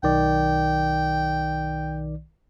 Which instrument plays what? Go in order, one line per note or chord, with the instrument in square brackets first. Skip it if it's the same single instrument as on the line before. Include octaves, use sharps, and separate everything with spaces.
[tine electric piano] B1 D#3 D5 [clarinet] G5